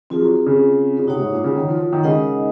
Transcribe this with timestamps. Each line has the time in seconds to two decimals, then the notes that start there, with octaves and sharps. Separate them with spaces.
0.10 F3 C4 F4 G#4
0.22 F#3
0.46 C#3
0.99 C#3
1.07 C3 D#4 F#4 C#5 F#5
1.20 G#2
1.32 A#2
1.44 C#3
1.56 D#3
1.68 F3
1.80 F3
1.93 D#3
2.04 C#3 G#3 D#4 A#4 D#5 F#5